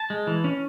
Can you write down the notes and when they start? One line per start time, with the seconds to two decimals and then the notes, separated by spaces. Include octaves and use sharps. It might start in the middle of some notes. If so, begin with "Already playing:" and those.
Already playing: A5
0.10 G#3
0.27 E3
0.44 C#4